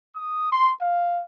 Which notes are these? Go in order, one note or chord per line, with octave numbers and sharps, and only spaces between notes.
D#6
C6
F5